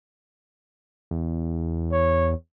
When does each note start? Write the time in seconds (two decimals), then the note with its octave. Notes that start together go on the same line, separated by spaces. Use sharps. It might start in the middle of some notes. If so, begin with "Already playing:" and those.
1.11 E2
1.92 C#5